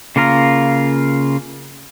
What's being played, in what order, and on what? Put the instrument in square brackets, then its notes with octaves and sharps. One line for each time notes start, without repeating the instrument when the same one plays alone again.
[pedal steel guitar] C#3 A#3 F4 A#4